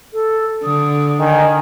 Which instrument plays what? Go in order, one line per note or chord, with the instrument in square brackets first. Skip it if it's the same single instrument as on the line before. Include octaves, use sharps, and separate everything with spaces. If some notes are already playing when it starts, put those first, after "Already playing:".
[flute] A4
[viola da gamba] D3 [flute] D#6
[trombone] D#3 [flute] G#5